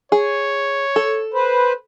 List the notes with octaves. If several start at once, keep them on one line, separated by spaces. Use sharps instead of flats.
G#4 C#5
A4
B4 C5